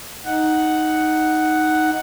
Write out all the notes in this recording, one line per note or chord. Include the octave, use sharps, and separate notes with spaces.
D#4 F#5